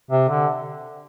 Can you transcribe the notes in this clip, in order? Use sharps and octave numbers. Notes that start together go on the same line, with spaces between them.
C3
D3